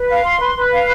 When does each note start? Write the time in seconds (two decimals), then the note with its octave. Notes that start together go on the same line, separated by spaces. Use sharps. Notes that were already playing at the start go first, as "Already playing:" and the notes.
Already playing: B4
0.09 F5
0.24 C6
0.40 B4
0.55 B4
0.71 F5